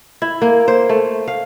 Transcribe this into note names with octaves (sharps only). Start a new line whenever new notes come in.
E4
A#3
C5
A3
F5